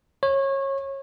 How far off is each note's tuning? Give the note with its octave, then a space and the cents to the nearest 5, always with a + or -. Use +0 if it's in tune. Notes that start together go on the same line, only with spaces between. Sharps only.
C#5 -25